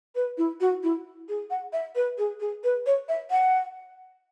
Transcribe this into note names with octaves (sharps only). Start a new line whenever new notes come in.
B4
E4
F#4
E4
G#4
F#5
E5
B4
G#4
G#4
B4
C#5
E5
F#5